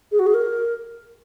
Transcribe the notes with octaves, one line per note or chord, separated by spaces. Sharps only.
G#4
F#4
G#4
A#4